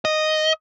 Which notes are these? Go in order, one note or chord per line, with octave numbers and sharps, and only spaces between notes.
D#5